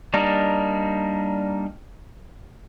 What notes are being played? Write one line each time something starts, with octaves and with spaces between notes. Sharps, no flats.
G3 A#3 D4 D#4 A#4